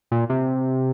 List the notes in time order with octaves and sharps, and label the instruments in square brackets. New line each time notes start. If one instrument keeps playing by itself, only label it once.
[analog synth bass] A#2
C3